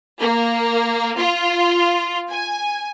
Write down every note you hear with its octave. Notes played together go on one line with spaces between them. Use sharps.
A#3
F4
G#5